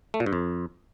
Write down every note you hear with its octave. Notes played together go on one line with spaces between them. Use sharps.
A3
A#2
G2
F2